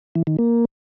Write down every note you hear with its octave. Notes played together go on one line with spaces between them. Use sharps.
E3
D#3
A#3